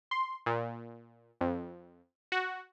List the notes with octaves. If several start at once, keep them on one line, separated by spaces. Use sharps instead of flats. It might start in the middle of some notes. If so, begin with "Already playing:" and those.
C6
A#2
F2
F#4